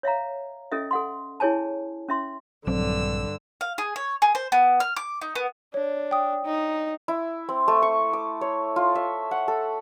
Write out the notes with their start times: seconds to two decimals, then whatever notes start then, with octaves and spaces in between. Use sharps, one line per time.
0.03 C#5 E5 F5 A#5
0.72 C#4 A4 D#5 E5
0.91 A4 F#5 C6
1.40 E4 G#4 C#5 G#5 A5
2.09 C#4 E5 C6
2.67 A#1 G2 D3 F#3 C4 E6
3.61 F5
3.78 G#4
3.96 C#5
4.22 G#4
4.35 C5
4.52 B3
4.80 F6
4.96 D6
5.21 D#4
5.35 B3
5.74 D4 C#5
6.11 G5 D#6
6.45 D#4
7.08 E4
7.49 C4
7.68 A3
7.82 C#6
8.13 D6
8.41 C#5
8.76 F4
8.95 E5
9.31 F#5
9.48 A4